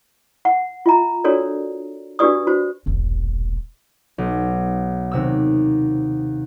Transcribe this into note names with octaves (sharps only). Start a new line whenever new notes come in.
F#5
F4 E5 A#5
D4 F#4 A4 A#4 C#5 D5
D4 F#4 G4 B4 D5 D#6
F#4 C5
E1 A#1
B1
D#2 C3 E6